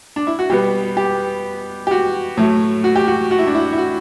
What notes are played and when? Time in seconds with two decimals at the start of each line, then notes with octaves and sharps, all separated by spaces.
0.16 D4
0.27 E4
0.39 F#4
0.50 B2 G3 B3 G4
0.97 G4
1.87 G4
1.91 F#4
2.37 A2 F#3 A3
2.84 F#4
2.96 G4
3.08 F#4
3.31 F#4
3.39 E4
3.47 D4
3.55 E4
3.73 E4
3.78 F#4